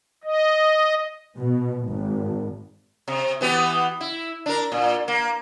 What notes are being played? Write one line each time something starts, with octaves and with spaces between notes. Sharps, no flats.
D#5
B2
G#1
C3
E3 B3 G4
E4
D4 A#4
A#2
A#3